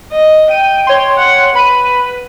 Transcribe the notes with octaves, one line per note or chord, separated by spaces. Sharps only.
D#5
G5 D#7
C#5 C6
F#5
B4 B5 D#7